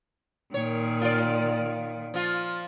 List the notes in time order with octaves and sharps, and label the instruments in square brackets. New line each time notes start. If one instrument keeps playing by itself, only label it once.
[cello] A#2 D#3 [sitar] C#5
[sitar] F4 D5
F3 F4